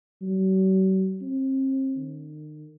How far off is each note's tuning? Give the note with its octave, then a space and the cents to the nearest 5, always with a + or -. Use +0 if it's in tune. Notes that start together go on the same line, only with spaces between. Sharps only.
F#3 +45
C4 +35
D#3 -40